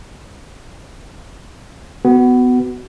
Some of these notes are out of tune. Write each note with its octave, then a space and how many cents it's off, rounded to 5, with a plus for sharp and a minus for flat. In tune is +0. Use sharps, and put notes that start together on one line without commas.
B3 +15 F#4 +10